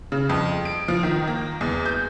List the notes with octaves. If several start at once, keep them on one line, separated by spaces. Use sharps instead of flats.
C#3
F2
D7
F3
D#3
A#3
E2
G6